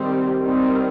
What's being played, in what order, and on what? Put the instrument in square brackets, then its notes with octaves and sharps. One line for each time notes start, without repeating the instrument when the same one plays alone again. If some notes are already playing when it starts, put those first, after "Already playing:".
Already playing: [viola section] D#3 G3 C4 G4
D#3 G3 C4